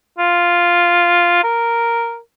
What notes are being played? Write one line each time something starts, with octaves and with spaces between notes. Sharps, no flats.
F4
A#4